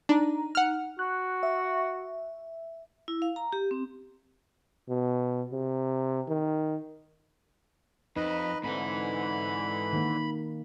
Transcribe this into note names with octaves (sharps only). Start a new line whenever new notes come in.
D4 D#4 A#5
F#5 F6
F#4 F#6
E5
E4
F5
A#5
G4
C4
B2
C3
D#3
F2 D#4 B4 D#5 B5
G#2 D3 E3 C4 D#4 B5
D#3 A#3